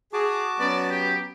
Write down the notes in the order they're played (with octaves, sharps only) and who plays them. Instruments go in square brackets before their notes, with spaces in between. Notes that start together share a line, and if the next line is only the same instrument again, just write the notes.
[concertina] F#4 A5 D6 [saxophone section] G#4
[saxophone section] F#3 B3 C#4 [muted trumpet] D5
[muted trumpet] G4